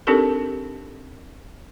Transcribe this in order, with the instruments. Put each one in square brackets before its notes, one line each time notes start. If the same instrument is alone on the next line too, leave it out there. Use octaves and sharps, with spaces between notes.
[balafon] C4 D4 D#4 G4 A4 A#4